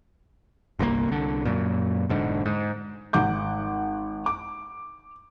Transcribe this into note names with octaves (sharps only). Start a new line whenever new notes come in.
G1 C2 A#2 A#3
C2 D3
F#2 A#2
E1 G#2 D3
G#2
G#1 F#5 D6 G6
D6